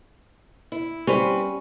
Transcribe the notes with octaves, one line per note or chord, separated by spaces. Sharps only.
E4
G3 C4 C#4 B4